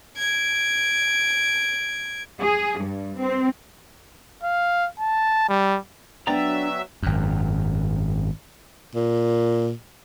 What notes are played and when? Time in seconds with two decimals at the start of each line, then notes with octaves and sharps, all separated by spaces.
0.17 G#6 D7
2.42 G#4
2.80 G2
3.18 C4
4.43 F5
4.99 A5
5.49 G3
6.27 F#3 B3 D4 D5 E5 G5 A#5
7.03 G#1 F#2
8.95 A#2